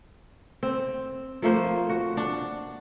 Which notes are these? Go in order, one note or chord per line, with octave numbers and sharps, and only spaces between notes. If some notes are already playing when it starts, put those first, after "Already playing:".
C4
F3 A3 A#3 C5
F#4
D4